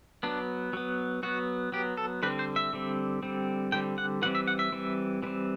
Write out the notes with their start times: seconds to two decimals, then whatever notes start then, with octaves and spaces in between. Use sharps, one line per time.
0.23 F#3 B3 D4
0.73 F#3 B3
1.23 F#3 B3 F#4
1.72 F#3 B3 G4
1.97 A4
2.23 D3 G3 C4 B4
2.39 C5
2.56 E5
2.73 D3 G3 C4
3.23 D3 G3 C4
3.72 D3 G3 C4 G5
3.98 F#5
4.22 E3 G3 C4 F#5
4.35 E5
4.48 F#5
4.59 E5
4.72 E3 G3 C4
5.22 E3 G3 C4